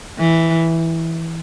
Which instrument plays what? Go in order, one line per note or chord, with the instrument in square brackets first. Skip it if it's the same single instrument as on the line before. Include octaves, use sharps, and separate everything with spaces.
[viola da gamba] E3